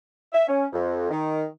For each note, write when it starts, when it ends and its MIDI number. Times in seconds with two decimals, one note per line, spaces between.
0.33 0.44 76
0.47 0.66 61
0.73 1.09 41
1.10 1.44 51